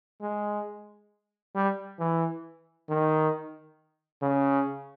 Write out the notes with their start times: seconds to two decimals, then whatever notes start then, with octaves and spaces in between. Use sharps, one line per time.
0.22 G#3
1.55 G3
1.99 E3
2.89 D#3
4.22 C#3